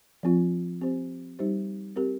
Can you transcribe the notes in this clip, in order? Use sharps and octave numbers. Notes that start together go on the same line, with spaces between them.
F3 C4 F4
C4 G4 C5
G3 D#4 G4 C5
C4 G4 A#4